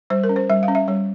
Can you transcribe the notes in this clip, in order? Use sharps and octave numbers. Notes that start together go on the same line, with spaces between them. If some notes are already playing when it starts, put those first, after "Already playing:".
G3 C5
A#4
C#4
C5
G3 E5
F5
C#4
E5
G3 C#5